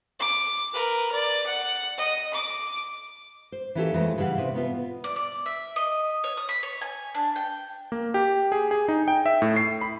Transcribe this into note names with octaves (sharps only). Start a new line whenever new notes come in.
D6
A#4 B4
D5
F#5
D#5
D6
C5
E3 A#3 C#4 F4 G4 A4
F2 E3 G#3 A3 D#5
C#3 E3 G3 F5 F#5
C3
B2 B3 F4
D5
D5
E5
D#5
C#5
D#6
B5
C#5
G#5
D4
G5
A#3
G4
G#4
G#4
D#4
G5
E5
A2
C7
B5